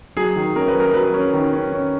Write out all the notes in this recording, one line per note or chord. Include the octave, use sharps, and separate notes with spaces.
F#3 G#4
D#3
C#4 A#4
B4
F#3
A#4
F#3 B4
C#4
D#3
C#4
C#4